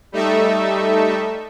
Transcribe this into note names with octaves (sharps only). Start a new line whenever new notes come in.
G3 A3 D#4 A4 E5